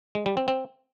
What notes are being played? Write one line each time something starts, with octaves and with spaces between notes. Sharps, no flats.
G#3
G3
C4
C4